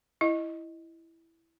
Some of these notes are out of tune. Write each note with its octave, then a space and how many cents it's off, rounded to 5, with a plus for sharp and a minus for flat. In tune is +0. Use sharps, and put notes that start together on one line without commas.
E4 +0 D#5 +0